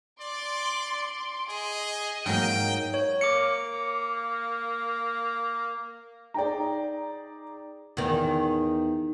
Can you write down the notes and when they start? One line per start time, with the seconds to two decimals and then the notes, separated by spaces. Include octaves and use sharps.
0.21 D5 C6 D6
1.49 G#4 D#5
2.26 G#2 F#3 A#3 G5
2.94 C#5
3.21 A#3 D6 C#7
6.34 D#4 G#4 D5 G5 A#5
7.97 E2 D#3